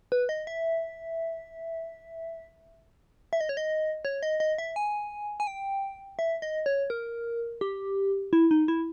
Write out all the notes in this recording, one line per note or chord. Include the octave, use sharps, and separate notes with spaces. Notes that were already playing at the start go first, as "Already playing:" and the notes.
B4
D#5
E5
E5
D#5
C#5
D#5
C#5
D#5
D#5
E5
G#5
G#5
G5
E5
D#5
C#5
A#4
G4
E4
D#4
E4